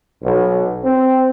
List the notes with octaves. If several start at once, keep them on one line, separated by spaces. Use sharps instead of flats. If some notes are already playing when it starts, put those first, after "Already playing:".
B1
C4